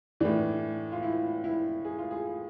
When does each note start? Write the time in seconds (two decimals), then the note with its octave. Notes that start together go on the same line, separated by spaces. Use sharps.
0.20 A2 E3 D4
0.92 F4
1.03 E4
1.44 E4
1.85 G#4
1.98 F4
2.11 G#4